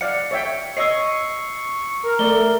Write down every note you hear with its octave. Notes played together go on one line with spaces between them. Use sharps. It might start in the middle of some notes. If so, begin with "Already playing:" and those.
D5 F5 F#5 C#7
C#5 E5 G5
C#5 D#5 C#6 E6 C7
A#4
A3 D5 G7